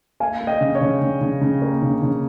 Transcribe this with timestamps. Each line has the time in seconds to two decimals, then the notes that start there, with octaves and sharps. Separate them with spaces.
0.20 A#3 F5 G#5
0.41 A#3
0.47 D#5 G5
0.61 C#3
0.75 C#5
0.81 C#3
1.01 C#3
1.21 C#3
1.41 C#3
1.62 A#3
1.82 C#3
2.02 C#3